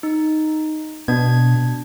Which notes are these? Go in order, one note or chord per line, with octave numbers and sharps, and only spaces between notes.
D#4
B2 D4 G#6